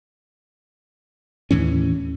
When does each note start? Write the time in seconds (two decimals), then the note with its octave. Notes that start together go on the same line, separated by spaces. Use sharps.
1.51 D#2 A2 E3 C#4